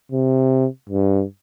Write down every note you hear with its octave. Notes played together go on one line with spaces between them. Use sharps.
C3
G2